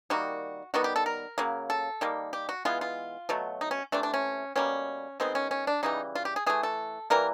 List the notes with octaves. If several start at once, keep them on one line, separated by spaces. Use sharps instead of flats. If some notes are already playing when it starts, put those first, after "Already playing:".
D#3 G3 A#3 F#4
D#3 G3 B3 F#4
G4
A4
A#4
C#3 F#3 A#3
A4
D#3 G3 A#3
G4
F#4
E3 G#3 B3 F4
F4
B2 F#3 A3
D#4
C#4
C3 E3 A3 D4
D4
C#4
B2 G3 A#3 C#4
D#3 G#3 B3 C4
C#4
C#4
D4
C#3 E3 G3 D#4
F4
G4
G#4
E3 A3 G#4
A4
E3 G3 A#3 A#4